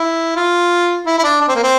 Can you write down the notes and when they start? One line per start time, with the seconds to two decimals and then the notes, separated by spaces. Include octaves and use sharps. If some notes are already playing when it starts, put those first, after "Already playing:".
Already playing: E4
0.36 F4
1.06 E4
1.18 E4
1.23 D4
1.41 D4
1.48 C4
1.55 A#3
1.63 C4